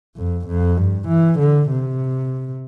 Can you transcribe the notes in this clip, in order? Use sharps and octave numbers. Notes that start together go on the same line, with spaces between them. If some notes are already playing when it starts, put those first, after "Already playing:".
F2
F2
G2
E3
D3
C3